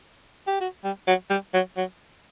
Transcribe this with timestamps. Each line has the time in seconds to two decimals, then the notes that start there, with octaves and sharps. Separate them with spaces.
0.47 G4
0.61 F#4
0.84 G3
1.07 F#3
1.30 G3
1.54 F#3
1.77 F#3